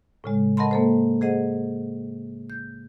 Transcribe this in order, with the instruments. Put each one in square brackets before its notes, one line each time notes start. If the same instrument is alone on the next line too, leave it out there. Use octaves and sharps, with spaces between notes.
[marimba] A2 C#3 G#3
A#4 D#5 F#5 A5 B5 C6
A#3 A4 C5
G#4 C5 D#5 F#5
G6